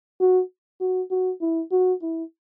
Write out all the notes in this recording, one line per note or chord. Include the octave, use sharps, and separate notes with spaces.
F#4
F#4
F#4
E4
F#4
E4